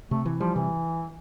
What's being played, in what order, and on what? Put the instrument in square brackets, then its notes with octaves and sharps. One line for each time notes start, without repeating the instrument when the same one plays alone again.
[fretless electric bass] C3 [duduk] A3
[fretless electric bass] E3
[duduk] F3 [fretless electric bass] G3
[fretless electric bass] C3 [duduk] E3